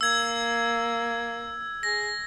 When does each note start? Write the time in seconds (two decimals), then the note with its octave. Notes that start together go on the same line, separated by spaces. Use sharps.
0.01 A#3 E6 G#6
1.83 G#4 A#6